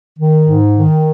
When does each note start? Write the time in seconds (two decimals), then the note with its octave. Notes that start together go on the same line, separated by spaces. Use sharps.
0.18 D#3
0.47 G#2
0.75 D#3